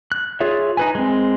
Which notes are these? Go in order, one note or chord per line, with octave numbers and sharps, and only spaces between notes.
F#6
F4 G#4 C#5 E5
D#4 B4 G#5
G#3 C4